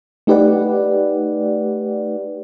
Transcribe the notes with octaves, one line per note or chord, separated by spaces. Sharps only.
A3 D#4 G4 B4 D5 F#5